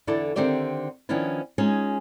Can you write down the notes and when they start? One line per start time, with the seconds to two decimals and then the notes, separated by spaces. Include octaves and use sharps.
0.07 E2 D3 E4 A4 D5
0.36 D3 D#3 C4 G4 D5 E5
1.09 D#3 F3 B3 C#4 D4 E4
1.58 G#3 C#4 D#4 F4 G#4